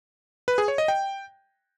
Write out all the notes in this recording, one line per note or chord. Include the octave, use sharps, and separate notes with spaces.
B4
G#4
C#5
D#5
G5